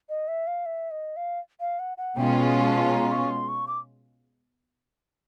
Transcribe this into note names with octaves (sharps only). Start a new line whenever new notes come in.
D#5
E5
F5
E5
D#5
F5
F5
F#5
F#5
B2 G#3 C#4 F4 G5
G#5
G#5
A5
A#5
C#6
C6
C#6
D6